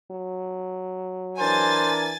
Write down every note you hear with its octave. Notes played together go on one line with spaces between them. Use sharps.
F#3
E3 D4 A#4 C5 G#5 A6